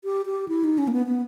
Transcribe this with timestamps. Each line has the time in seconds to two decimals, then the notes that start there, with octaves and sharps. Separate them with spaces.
0.04 G4
0.26 G4
0.48 E4
0.64 D#4
0.78 C#4
0.88 A#3
0.93 B3
1.07 B3